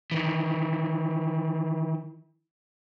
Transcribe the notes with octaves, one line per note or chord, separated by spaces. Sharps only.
D#3 E3